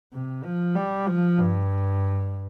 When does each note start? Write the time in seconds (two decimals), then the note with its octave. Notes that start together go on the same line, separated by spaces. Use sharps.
0.13 C3
0.44 F3
0.75 G3
1.07 F3
1.38 G2